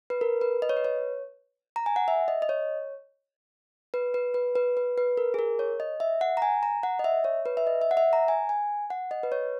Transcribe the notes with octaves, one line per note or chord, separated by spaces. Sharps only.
B4
A#4
B4
D#5
C#5
B4
C#5
A#5
G#5
F#5
E5
D#5
D#5
C#5
B4
B4
B4
B4
B4
B4
A#4
G#4
A#4
C#5
D#5
E5
F#5
A#5
G#5
A#5
F#5
D#5
E5
C#5
B4
E5
D#5
E5
F#5
E5
A#5
G#5
G#5
F#5
D#5
B4
C#5